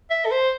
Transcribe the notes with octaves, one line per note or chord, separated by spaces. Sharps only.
E5
A4
C5